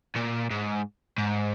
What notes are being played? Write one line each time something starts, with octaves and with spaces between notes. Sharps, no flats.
A#2
G#2
G#2